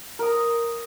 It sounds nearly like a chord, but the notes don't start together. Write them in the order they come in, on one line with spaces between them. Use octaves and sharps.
A#4 D#6 A#5